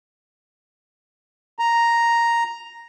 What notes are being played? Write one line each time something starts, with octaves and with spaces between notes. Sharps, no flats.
A#5